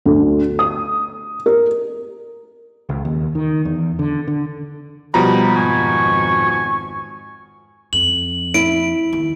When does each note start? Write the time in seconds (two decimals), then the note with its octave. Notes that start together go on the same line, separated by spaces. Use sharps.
0.06 D2
0.59 D#6
1.46 A#4
2.89 C#2
3.05 D#2
3.35 D#3
3.65 E2
3.99 D3
4.28 D3
5.14 B2 F3 G3 A#5 B5
5.56 G#1 F2 G#5 C#6
7.93 F2 F#7
8.54 E4 D7
9.13 D#2